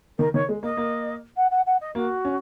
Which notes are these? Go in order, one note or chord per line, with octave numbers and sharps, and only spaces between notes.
D#3 A#4
D#3 C#5
G#3
A#3 D#5
A#3
F#5
F#5
F#5
D#5
A#3 F#4
C#4